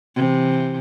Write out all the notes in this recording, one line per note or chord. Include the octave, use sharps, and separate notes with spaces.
C3 E3